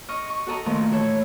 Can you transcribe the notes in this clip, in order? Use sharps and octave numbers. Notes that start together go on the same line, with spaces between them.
D#5 C#6 F6
C#6
F#4 A4 D#5 A#5
A#2 D#3 F3 A3
E3 A4 C#5